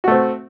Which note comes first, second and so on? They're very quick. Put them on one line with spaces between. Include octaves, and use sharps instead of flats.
F#4 A3 C4